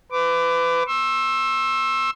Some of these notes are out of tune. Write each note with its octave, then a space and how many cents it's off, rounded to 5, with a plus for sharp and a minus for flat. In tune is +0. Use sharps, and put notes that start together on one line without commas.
B4 +30 D6 +0
C6 +45 E6 +0